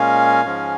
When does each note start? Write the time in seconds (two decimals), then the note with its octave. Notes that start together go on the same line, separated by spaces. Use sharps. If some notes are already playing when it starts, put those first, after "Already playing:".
Already playing: A#2 G#3 C#4 F5 G#5
0.45 G#2 F3 G#3 C#4